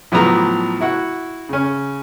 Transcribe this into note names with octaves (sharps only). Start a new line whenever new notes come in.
A2 F3 F#3 B3 A#5
E4 F#4 F#5
C#3 C#4